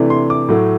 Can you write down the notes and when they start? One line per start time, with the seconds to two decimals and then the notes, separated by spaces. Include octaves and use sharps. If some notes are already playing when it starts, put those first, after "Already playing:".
Already playing: C3 E3 A3 D4
0.10 C6
0.30 D6
0.48 A2 F#3 A3